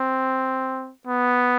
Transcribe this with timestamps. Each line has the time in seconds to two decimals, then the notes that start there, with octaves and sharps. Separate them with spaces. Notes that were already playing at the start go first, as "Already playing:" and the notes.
Already playing: C4
1.07 B3